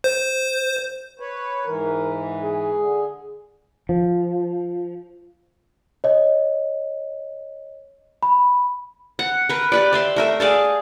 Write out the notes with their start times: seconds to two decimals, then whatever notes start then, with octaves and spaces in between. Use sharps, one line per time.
0.04 C5
1.20 B4 C#5
1.65 G#2 E3 A#4
2.43 G#4
2.76 D3
3.89 F3
6.04 C#5 D#5
8.23 B5
9.19 F#5
9.49 A#4 B4
9.72 G4 B4 D5
9.93 D5 E5 C6
10.16 A3 A#4 E5
10.40 G#4 D5 F5 A5